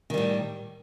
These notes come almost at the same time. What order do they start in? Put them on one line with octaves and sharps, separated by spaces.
D#3 G3 A2